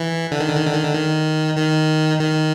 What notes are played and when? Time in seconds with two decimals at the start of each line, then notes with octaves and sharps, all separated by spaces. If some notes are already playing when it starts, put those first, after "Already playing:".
Already playing: E3
0.31 D3
0.40 D#3
0.48 D3
0.56 D#3
0.66 D3
0.74 D#3
0.83 D3
0.94 D#3
1.57 D#3
2.20 D#3